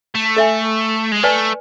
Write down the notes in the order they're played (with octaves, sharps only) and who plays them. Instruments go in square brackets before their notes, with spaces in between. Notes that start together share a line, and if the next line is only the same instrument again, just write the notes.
[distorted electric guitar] A3
[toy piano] A4 E5 G#5
[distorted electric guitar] G#3
[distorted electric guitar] A3 [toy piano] B4 D5 G#5